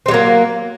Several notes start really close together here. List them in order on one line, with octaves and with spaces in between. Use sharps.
C4 G3 F#3 A#3